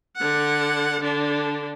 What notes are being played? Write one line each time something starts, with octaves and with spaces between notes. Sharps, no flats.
D3 F#5
D3 D4